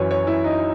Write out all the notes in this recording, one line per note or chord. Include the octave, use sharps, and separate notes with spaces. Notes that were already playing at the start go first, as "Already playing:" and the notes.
Already playing: F#2 E3 C#5
C#5
E4
D#4